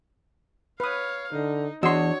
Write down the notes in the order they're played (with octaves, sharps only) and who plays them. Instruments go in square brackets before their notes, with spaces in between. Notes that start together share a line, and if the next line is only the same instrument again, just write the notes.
[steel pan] B4 D#6 [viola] C#5 F5
[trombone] D3 [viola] D#4
[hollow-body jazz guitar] E2 C6 [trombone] D4 [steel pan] F#4 D#5 E6 [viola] C#5